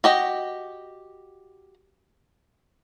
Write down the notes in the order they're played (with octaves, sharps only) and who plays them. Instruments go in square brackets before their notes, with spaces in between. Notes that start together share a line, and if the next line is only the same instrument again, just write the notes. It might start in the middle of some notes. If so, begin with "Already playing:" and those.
[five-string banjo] F#4 G4 D#5